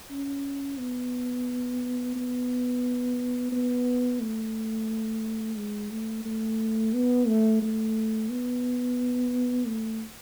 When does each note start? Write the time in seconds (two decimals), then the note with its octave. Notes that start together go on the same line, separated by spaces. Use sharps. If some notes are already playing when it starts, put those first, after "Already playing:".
0.11 C#4
0.79 B3
2.15 B3
3.52 B3
4.20 A3
5.57 G#3
5.91 A3
6.25 A3
6.93 B3
7.27 A3
7.62 A3
8.30 B3
9.67 A3